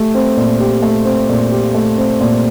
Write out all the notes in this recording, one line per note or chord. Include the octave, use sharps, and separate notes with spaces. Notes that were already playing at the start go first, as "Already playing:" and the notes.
Already playing: A3 G4
C4
A#2
G4
A3
C4
A#2
G4
A3
C4
A#2